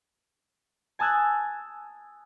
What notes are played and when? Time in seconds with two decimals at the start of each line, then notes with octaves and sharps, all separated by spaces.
0.99 G#5 A5 D#6 E6 F#6 G#6